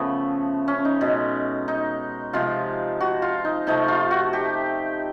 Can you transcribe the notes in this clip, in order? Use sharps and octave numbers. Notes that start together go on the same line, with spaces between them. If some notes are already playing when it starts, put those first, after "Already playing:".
Already playing: C#3 F3 A3 B3
C#4
D#4
B2 G#3
D#4
C3 F3 G#3 F4
F#4
F4
D#4
C3 F3 A3 D#4
F4
F#4
G4